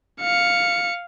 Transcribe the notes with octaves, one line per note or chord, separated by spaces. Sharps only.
F5 C#7